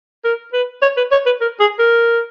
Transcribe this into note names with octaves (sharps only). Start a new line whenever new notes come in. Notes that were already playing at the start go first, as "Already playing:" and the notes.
A#4
B4
C#5
B4
C#5
B4
A#4
G#4
A#4